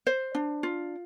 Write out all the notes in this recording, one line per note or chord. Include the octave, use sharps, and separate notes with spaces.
C5
D4
F4